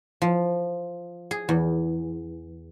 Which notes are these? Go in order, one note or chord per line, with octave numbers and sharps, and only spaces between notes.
F3
G#4
E2